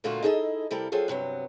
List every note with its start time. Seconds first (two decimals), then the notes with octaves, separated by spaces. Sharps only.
0.04 A#2 D3 A3 A#3 F4 F#4
0.23 D#4 E4 G#4 A4 C5 D#5
0.71 C3 G3 E4 A4 A#4
0.92 F#3 C4 F4 G#4 A4
1.08 G2 C3 F#3 B3